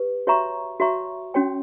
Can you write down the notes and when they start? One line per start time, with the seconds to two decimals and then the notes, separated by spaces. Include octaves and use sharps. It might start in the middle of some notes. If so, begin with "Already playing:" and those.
Already playing: G4 B4
0.27 F#4 C#5 E5 A#5 C#6
0.80 F#4 C#5 E5 A#5 C#6
1.34 C#4 F#4 C#5 G5